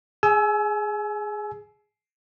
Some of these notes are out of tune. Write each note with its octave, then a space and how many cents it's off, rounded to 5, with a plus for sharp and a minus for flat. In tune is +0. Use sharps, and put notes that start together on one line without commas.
G#4 +0 G#5 +35 E6 +0